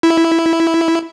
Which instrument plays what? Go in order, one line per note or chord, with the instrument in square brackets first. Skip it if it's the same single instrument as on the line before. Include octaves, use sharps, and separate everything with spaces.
[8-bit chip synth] E4